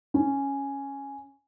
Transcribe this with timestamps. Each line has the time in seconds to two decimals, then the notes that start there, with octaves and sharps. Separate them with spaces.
0.14 C#4